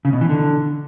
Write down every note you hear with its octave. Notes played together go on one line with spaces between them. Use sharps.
C#3
B2
E3
D3